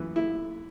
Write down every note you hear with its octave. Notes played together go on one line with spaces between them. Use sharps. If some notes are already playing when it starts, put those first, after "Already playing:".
Already playing: F#2 E3
E4